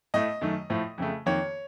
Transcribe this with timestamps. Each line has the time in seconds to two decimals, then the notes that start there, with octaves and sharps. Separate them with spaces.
0.14 A2 A3 D#5
0.41 F#2 D#3 A3
0.70 A2 F3 A3
0.98 F2 C#3 A3
1.26 F2 D#3 A#3 C#5